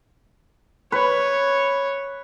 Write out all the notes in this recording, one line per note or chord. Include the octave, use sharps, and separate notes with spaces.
B4 C#5